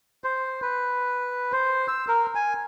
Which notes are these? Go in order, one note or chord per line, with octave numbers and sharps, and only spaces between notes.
C5
B4
C5
E6
A#4
G#5